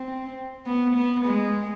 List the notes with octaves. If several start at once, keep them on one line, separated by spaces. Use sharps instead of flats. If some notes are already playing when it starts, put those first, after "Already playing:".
Already playing: C4
B3
B3
G#3